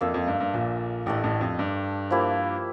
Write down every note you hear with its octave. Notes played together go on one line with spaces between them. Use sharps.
F2 A#3 D4 A4 E5
F2
G2
G2
A#1 A#2
A1 A2 A3 D4 G4
A1 A2
F2
G2
F3 A#3 E4 G4